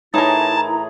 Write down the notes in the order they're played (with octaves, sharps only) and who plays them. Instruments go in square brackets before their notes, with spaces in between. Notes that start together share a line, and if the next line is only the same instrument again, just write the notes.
[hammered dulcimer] A2 E3 G#4 [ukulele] D#4 A#4 [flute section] E4 A#5 [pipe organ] A5